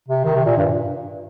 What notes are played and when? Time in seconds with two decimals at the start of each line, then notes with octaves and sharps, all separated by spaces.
0.08 C3
0.24 D#3
0.35 C3
0.45 A#2
0.57 G2